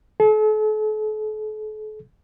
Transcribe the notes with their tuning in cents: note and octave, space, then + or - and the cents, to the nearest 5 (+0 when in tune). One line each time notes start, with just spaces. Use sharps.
A4 -40